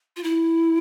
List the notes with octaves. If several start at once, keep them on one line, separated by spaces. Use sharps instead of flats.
F4
E4